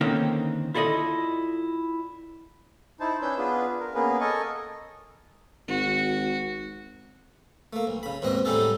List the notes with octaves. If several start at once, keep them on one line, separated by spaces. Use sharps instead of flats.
D3 D#3 A#3 C4 C#4 D#4
E4 F4 A4 D5 D#5
D#4 E4 C5 A5
C#4 D4 B4 C#5 E6 G6
B3 D4 F4 G#4 B4
A#4
A#3 B3 C#4 G#4 A#4 B4
A4 A#4 D#5 G#5 C#6 D#6
G#1 F#4
A3 A#3
B1
C#3 B5
D#2 G#2 B2 C4 D#5
A2 F#3 G3 D#4 G#4 A4